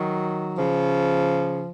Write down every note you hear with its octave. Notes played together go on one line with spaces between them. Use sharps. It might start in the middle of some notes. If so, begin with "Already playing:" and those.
Already playing: D#3 F#3
C#3 F3